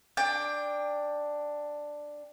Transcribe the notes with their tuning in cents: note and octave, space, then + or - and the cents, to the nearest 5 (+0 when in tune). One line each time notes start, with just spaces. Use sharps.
D4 +5 G5 +25